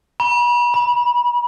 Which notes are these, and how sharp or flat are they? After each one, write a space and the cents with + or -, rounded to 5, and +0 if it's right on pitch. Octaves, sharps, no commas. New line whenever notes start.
B5 -40
B5 -20